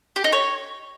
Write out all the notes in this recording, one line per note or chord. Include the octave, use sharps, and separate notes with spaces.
G4
D#4
C#5